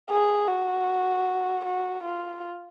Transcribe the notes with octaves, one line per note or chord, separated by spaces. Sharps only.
G#4
F#4
F#4
F4